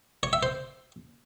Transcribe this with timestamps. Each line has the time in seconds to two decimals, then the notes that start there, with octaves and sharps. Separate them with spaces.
0.23 C#5
0.33 E5
0.43 C5